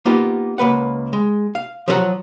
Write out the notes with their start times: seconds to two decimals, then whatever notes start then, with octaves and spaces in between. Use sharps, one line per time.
0.06 A#3 B3 D#4 F4 G4
0.58 C#2 A#3 B4 F#5
1.13 G#3
1.55 F5
1.88 F3 F#3 E4 A4 F#5 A#5